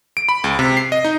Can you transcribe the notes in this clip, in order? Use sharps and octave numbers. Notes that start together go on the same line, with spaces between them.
D7
B5
C#2
C3
C7
D#5
D#4